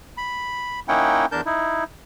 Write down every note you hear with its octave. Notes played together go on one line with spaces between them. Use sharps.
B5
A#3 C#4 D#4 E4 F#5 G5
E2 D4 A#4 A5 G6
D#4 E4